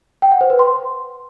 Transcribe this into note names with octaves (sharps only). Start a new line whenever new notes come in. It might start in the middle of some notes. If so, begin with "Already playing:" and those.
G5
F#5
C5
B4
C6